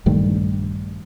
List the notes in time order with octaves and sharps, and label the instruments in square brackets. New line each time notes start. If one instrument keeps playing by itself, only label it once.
[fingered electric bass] A#1 G2 D#3 A3